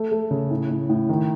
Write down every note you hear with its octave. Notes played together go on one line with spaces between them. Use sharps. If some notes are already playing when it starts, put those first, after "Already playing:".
Already playing: A3
A3
C#3
A2
A2
A2
D#3